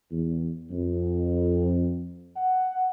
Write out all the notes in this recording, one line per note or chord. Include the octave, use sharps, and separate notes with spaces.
E2
F2
F#5